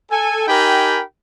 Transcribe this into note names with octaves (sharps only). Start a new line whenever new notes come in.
A4 G#5
D#4 G4 A#4 G5 G#5 B5